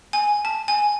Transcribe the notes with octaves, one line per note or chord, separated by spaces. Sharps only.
G#5
A5
G#5